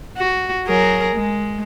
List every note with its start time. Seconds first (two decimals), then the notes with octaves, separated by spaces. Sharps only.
0.18 F#4
0.66 F#3 G#4 A#4
1.16 G#3